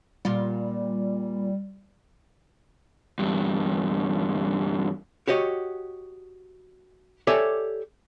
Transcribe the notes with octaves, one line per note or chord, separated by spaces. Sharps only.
A#2 G3 F4
E2 G2
F#4 G4 C#5 D#5
G4 A4 C#5 D5 E5 G#5